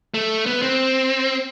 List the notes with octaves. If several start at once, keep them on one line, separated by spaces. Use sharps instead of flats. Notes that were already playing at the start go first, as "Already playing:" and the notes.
A3
B3
C4